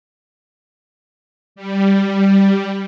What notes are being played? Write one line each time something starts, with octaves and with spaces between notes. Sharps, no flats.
G3